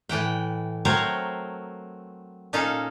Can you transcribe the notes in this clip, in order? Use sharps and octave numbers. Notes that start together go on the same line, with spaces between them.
A2 E3 F#5 G5
F#3 A3 C4 A#4 C5 C#5
A#2 C#4 D#4 A4 F5